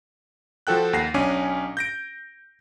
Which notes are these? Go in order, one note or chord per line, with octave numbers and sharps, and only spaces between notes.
F3 F#4 A4 G5 F#6
D#2 F#5 A#6 C7
B1 C#4 D4 G#5 D6 D#7
G6 A#6 D7